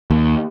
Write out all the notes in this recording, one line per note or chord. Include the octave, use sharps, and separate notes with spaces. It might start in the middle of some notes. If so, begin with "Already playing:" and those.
D#2